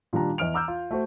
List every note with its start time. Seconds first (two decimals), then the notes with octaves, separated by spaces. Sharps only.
0.13 A#2 D#3 G3 D4 A#5
0.38 E2 E4 D#5 F6 D7 F7
0.54 A#5 D6 E6 F6 G6
0.68 F4
0.91 A3 F#4 C5